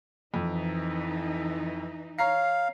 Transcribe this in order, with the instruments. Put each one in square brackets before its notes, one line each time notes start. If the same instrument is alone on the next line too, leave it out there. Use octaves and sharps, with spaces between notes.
[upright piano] F2 [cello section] E3 D#4
[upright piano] C#5 A#5 C7 [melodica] F5